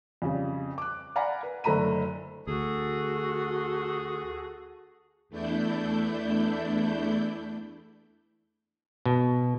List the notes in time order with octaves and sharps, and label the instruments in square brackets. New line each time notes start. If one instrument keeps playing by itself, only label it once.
[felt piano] F2 C#3 G3
D6 F#6
D5 F5 F#5 G#5 A#5 B5
B4
F#1 D3 A3 A#5 B5 D#7
[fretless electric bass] D2 [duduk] F#4 [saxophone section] G#4 A4
[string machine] E2 A3 D4 E4 G6
[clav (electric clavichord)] B2